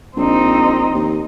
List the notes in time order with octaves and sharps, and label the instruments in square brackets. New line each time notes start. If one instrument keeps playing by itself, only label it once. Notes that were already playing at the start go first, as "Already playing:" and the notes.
[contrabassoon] A#1 [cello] C4 D#4
[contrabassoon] D#2